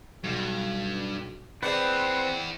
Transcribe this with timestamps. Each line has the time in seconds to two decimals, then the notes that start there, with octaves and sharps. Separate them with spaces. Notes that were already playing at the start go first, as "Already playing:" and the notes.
0.24 B1 G2
1.63 C4 E4 G#4 B4 D5 F#5 A5